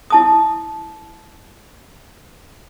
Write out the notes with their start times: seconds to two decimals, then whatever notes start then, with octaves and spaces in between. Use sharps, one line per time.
0.10 E4 A5 D#6